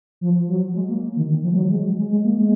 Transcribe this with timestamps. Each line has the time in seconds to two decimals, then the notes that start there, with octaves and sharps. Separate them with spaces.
0.21 F3
0.48 F#3
0.75 G#3
0.89 A#3
1.16 D#3
1.29 D#3
1.43 F3
1.53 G#3
1.56 F#3
1.70 G#3
1.97 G#3
2.11 G#3
2.25 A#3
2.38 G#3